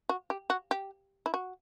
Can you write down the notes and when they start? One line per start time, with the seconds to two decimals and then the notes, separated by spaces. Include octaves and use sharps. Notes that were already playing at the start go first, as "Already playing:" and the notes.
0.09 F#4
0.30 G4
0.50 F#4
0.71 G4
1.26 E4
1.34 F#4